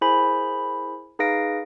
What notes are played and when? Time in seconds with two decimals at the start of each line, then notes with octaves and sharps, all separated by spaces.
0.01 E4 G#4 A#4 C5 G#5 B5
1.19 D#4 G#4 B4 F5 A#6 D7